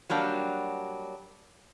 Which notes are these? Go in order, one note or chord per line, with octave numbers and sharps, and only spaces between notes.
F#3 G3 A#3 D4